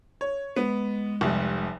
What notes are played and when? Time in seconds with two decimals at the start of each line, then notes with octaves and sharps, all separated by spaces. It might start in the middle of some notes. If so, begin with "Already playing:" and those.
0.21 C#5
0.56 G#3 B3
1.21 F1 C2